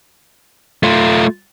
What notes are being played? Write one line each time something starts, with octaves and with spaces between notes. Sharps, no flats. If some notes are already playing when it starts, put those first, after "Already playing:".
A3 F4